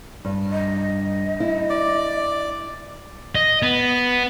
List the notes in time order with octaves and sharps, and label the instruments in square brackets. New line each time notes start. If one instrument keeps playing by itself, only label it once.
[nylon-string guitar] G2
[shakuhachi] D#5
[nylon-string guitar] E4
[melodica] D5
[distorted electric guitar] D#5
B3